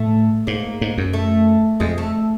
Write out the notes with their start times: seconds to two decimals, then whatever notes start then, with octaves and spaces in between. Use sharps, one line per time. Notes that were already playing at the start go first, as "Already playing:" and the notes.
Already playing: A2 A3
0.47 G#2 A#3
0.81 G#2
0.98 F#2
1.13 A3
1.80 F2 G#3
1.98 A3